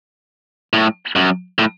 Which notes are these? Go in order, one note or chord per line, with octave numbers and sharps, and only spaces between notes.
A2
F#2
A2